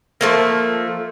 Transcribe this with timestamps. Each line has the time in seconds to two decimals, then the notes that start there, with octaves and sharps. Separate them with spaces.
0.21 F3 A3 A#3